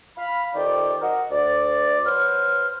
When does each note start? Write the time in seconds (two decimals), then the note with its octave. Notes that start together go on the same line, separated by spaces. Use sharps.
0.18 F5 B5
0.54 F2 D#3 G4 D5
1.02 F#4 A#4 D#5
1.31 D2 D5
2.05 F#3 B4 C5 F6